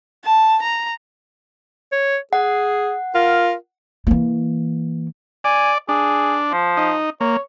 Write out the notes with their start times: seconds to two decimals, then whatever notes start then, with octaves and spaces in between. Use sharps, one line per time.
0.25 A5
0.63 A#5
1.92 C#5
2.33 G#4 F#5
3.14 F4 A#4
4.07 E3 A#3
5.44 D5 G#5
5.89 D4 G#4
6.52 F3
6.77 D#4
7.21 A#3 C#5